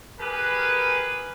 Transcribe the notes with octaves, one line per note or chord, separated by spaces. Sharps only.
G4 G#4 A#4 B4